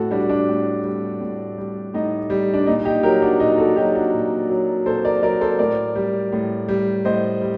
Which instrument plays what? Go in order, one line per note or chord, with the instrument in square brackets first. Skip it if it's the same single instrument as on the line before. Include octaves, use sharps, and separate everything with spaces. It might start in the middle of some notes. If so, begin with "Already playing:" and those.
Already playing: [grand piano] A2 F#4 A4
G3 D4 F#4
D4
A2
G3
A2
G3
A2 D#4
G3
D4
A#2 D#4
D#4 G4
F#3 G4 A#4
D4 F#4
A#2 D#4
F#4 A4
F#3 D#4 G4
D4 F#4
A#2
F#3
A#2 A4 C5
A#4 D5
F#3 A#4 D5
A4 C5
A2 A#4 D5
G3
A2
G3
A2 C5 D#5
G3